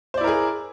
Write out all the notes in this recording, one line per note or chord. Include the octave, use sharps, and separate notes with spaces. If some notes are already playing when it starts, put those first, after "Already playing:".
E4 G#4 A#4 C5 D5